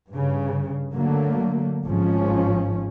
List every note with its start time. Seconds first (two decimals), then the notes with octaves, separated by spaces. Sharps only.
0.11 G2 C#3
0.93 D3 F#3 A3 A#3
1.85 G#1 G#2 F3 C#4